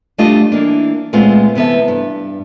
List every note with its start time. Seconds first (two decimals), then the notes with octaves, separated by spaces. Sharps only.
0.18 G3 A3 D4 F4 G4 D#5
0.52 E3 A#3 D4
1.13 A#2 G#3 A3 B3 C4 F4
1.55 C3 E3 B3 A4 E5
1.88 G2